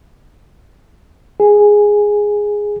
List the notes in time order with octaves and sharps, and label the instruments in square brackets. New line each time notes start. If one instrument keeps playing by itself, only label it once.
[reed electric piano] G#4